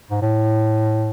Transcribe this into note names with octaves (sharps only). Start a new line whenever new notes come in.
G#2
A2